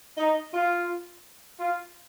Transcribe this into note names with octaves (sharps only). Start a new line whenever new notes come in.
D#4
F4
F4